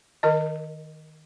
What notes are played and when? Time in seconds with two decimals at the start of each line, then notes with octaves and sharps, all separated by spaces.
0.23 D#3 A#4 D#5